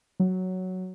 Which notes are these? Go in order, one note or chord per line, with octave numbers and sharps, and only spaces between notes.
F#3